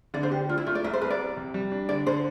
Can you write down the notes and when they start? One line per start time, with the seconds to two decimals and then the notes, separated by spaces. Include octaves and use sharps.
0.14 D3 D5
0.23 C5
0.31 D3 G4
0.49 D4 F4
0.58 E4
0.66 A3 F4
0.75 D5
0.84 C2 E5
0.93 C5
1.01 C2 B4
1.10 D5
1.19 C2
1.37 C3
1.54 G3
1.72 D4
1.89 D3 D5
2.07 D3 C5